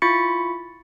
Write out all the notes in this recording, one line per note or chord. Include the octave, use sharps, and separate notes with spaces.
E4 F4 B5 C#6 A6 C#7